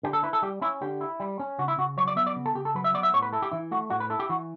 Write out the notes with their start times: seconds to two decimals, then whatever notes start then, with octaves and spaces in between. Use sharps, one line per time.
0.03 D3 G4
0.13 A4
0.23 E4 B4
0.33 A4
0.42 G3 G4
0.61 C#4 E4
0.81 D3 G4
1.01 E4
1.20 G3
1.39 C#4
1.59 C#3 F#4
1.68 E4
1.78 C#3 F#4
1.97 F#3 C#5
2.08 D5
2.16 B3 E5
2.27 D5
2.36 C#3
2.46 A4
2.55 C#3 G4
2.65 A4
2.75 F#3 B4
2.84 E5
2.94 B3 D5
3.03 E5
3.13 A2 C#5
3.22 B4
3.33 E4 A4
3.42 G4
3.52 E3 E4
3.71 A3 F#4
3.90 A2 F#4
4.00 B4
4.10 E4 A4
4.19 G4
4.29 E3 F#4